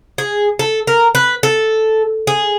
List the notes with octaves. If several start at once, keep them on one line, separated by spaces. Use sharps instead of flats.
G#4
A4
A#4
B4
A4
G#4